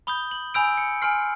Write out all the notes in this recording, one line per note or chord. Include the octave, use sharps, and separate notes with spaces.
B5 D#6 G6 G7
F#7
G#5 B5 E6 G6 D7
C#7
G#5 C6 F6 C7